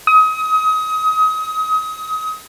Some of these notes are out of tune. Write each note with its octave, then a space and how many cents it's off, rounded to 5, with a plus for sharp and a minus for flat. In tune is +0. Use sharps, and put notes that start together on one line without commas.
D#6 +30